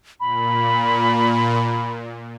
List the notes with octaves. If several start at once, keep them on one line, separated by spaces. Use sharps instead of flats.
A#2 B5